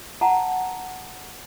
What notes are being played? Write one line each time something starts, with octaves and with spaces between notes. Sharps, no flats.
F#5 A5 A#5